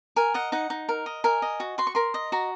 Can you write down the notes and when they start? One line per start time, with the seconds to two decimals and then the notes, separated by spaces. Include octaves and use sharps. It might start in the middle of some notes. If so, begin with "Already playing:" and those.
0.16 A#4 G#5
0.34 D#5 F#5
0.52 D#4 F#5
0.70 D#4
0.89 A#4
1.06 D#5
1.24 A#4 G#5
1.42 D#5
1.60 F#4
1.78 F#4 C6
1.87 C#6
1.95 A#4 C6
2.14 D#5
2.32 F#4 A#5